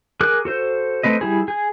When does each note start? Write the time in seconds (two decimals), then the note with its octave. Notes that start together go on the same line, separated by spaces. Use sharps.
0.21 G#4 A#4 D6 F#6
0.45 F#4 A4 C5
1.03 A3 C4 B4 D#5
1.21 G3 E4 G#4
1.48 G#4